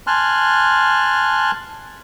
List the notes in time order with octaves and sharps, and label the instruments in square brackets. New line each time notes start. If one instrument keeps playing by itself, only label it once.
[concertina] G#5 A5 C6 F6 F#6